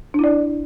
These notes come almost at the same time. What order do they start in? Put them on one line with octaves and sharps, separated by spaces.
D4 E4 D5